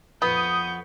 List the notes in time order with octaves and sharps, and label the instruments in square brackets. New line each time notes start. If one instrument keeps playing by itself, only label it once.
[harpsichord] F2 B4 [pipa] B3 [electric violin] C#6 G6 [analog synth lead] D#6